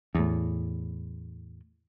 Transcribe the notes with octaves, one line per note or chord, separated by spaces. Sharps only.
E2 A2